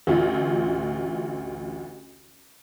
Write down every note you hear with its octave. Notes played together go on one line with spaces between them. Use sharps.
A1 D2 F4